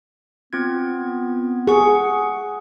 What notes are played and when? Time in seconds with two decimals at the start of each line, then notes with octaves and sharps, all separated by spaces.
0.53 B3 C4 F4 G#6
1.67 G#4 F#5 C#6